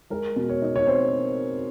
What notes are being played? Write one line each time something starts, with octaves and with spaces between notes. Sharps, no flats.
G#3 A#4
B2
C#5
D#4
C#5
C4 C5